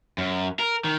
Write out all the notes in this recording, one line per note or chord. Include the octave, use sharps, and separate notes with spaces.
F#2
A#4
D#3